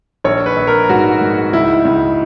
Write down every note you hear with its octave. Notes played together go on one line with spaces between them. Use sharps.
A#1 C#5
B4
A#1
A#4
G#2 F#4
G#2
C#2 E4
C#2